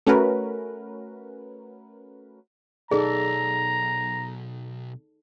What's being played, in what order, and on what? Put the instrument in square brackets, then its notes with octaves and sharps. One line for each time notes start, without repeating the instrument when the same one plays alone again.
[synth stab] A3 C#4 F#4 A#4 B4
[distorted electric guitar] B1 [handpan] D#4 A4 D5 [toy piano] G#4 [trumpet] A#5